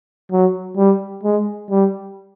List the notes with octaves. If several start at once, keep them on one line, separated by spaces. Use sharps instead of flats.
F#3
G3
G#3
G3